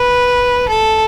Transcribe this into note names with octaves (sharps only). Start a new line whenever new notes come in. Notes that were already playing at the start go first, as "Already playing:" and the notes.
Already playing: B4
A4